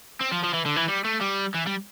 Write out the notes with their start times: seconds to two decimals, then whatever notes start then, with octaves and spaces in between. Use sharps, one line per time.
0.21 C4
0.32 F3
0.43 F3
0.54 E3
0.66 D3
0.76 E3
0.88 G3
1.04 A3
1.21 G3
1.54 E3
1.66 G3